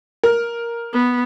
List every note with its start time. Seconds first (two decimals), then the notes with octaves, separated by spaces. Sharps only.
0.23 A#4
0.92 B3